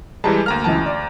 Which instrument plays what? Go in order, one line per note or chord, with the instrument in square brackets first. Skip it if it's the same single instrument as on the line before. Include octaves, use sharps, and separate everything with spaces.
[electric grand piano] E3 G3 G#3 [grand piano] A5
[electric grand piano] D2 A#5 F6 [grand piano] A#3
[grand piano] C#2 E3 A5
D5